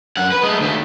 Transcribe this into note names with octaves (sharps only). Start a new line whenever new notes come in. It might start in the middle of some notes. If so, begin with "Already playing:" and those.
F#2 F#5
B4
G#3 A3
D#2 A3